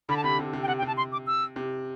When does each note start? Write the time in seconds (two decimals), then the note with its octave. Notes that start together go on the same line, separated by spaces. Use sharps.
0.09 D3 B5
0.17 A5
0.24 C3 B5
0.39 C3
0.53 C3
0.63 G5
0.68 C3 F#5
0.78 G5
0.82 C3 A5
0.97 C6
1.12 D6
1.27 E6
1.56 C3